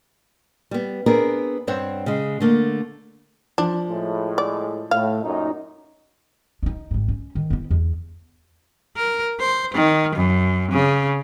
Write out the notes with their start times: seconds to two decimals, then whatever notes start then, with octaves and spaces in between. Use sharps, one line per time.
0.71 G3 B3
1.06 B3 C4 D4 G#4 A#4
1.67 G2 C4 C5 C#5 F#5
2.06 C#3 G#3
2.40 D3 A3 A#3
3.58 F3 D4
3.89 A2 G#3
4.38 D5
4.91 A2 F5
5.22 F#2 A#2 D#4
6.63 D4 D#4
6.91 G#1 G#2
7.08 C#4
7.35 D#3
7.50 B3 E4
7.71 E2
8.96 A#4
9.39 C5
9.74 D#3
10.16 F#2
10.72 C#3